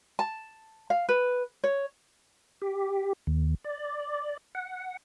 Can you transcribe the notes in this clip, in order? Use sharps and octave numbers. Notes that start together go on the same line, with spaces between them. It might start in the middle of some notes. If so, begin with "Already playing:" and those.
A5
F5
B4
C#5
G4
D#2
D5
F#5